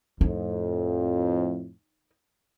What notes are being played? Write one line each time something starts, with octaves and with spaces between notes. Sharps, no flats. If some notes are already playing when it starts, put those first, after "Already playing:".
F2 A2 D#4